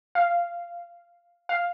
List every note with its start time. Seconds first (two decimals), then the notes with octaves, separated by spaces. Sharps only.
0.15 F5
1.49 F5